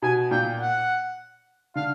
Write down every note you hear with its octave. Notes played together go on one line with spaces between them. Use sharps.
B2 G#5
A#2 G5
F#5
D3 F5